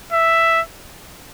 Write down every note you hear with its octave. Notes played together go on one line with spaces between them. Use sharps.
E5